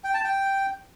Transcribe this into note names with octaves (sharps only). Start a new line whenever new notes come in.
G5
A5
G5